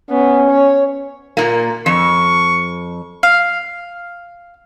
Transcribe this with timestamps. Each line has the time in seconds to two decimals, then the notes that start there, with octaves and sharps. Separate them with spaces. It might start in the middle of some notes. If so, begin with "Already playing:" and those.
0.10 B3 C#4
0.51 C#5
1.37 A#2 A#3
1.86 F2 C#6
3.23 F5